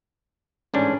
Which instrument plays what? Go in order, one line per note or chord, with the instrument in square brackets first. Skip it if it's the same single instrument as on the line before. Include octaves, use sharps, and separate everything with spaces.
[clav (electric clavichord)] A1 G#2 D4 [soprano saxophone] C#4